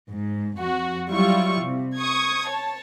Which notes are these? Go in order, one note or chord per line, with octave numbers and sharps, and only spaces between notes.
G#2
F2 F#4
F#3 G3 E4 F4 C#6
C3
C#6 D#6 G#6
C#5 A5